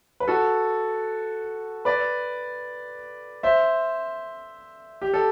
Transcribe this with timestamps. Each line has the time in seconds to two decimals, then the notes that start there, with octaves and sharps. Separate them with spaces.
0.20 B4
0.28 F#4 A4
1.85 B4 D5
3.43 C5 E5
5.02 G4
5.14 A4